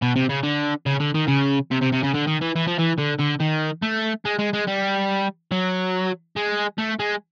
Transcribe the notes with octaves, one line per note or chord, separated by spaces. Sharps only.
B2
C3
C#3
D3
C#3
D3
D#3
C#3
C3
C3
C3
C#3
D3
D#3
E3
E3
F3
E3
D3
D3
D#3
A3
G#3
G#3
G#3
G3
F#3
G#3
A3
G#3